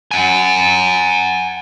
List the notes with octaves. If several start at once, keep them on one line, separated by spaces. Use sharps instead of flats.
F#5 G#5